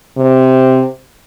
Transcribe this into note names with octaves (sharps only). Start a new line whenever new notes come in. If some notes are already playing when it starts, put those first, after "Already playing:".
C3